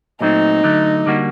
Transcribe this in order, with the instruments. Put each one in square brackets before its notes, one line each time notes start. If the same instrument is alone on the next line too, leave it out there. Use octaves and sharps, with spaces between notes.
[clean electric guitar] A#2 F#3 A3 C4 [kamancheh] D#4
[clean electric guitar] D3 F#3 A3
D3 G3 A#3 F#4